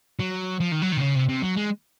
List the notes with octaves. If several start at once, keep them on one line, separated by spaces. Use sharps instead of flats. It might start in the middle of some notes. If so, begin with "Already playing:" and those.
F#3
F3
D#3
F#3
D#3
C3
C#3
C3
C3
F#3
G#3